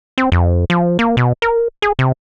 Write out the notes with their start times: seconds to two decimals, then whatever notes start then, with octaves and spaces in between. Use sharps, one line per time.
0.18 C4
0.32 F2
0.70 F3
0.99 A#3
1.17 B2
1.42 A#4
1.82 G#4
1.99 C3